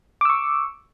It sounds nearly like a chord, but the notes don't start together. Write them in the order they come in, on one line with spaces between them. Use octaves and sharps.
D6 E6 C#6